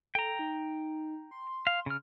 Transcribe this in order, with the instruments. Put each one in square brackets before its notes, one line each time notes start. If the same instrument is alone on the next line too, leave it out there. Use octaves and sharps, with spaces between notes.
[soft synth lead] A4 [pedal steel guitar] G5 A#5
[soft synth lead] D#4
C6
[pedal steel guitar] F5
C#3 F6